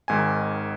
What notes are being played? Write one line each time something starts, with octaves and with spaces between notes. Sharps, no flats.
G#1 G#2 D#3 G#5